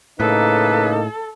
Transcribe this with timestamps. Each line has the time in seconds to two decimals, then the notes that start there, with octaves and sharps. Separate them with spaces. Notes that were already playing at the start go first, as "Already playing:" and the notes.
0.20 A2 C#3 A#3 D#4 A4 B4